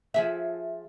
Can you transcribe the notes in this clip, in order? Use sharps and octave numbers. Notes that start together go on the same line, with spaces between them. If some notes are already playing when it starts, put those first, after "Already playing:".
F3 G#4 E5